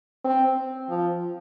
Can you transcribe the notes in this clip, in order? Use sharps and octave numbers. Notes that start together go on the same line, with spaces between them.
C4
F3